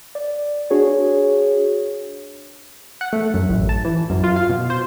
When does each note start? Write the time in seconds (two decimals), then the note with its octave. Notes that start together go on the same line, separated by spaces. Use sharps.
0.15 D5
0.70 D4 F#4 G#4 C#5
3.01 F#5
3.13 A3
3.34 F#2
3.49 A1
3.69 A5
3.85 E3
4.10 F#2
4.24 F4
4.36 F5
4.49 B2
4.70 C5